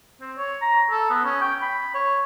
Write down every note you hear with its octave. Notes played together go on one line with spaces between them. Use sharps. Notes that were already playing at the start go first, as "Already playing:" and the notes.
C4
C#5
A#5
A4
B3
C#4
G5
B5
C#5